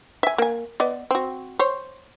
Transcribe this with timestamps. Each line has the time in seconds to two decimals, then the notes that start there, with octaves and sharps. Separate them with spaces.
0.23 E5 G#5
0.38 A#3 G#5
0.80 B3 D5 D#5
1.11 C4 F#4
1.59 C5 C#5